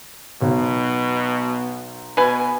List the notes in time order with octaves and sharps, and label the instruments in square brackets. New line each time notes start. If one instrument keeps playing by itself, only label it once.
[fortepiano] B1 [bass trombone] B2
[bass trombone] B2 [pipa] B4 G#5